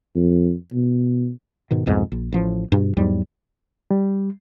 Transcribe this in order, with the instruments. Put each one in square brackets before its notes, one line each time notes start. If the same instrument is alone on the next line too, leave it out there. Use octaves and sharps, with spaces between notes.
[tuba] F2
B2
[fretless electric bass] G#2 B2 D#3
C2 F2 G#2 B2
A#1
A1 F3
G2 B2
E2 G#2 F#3 G3
[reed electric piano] G3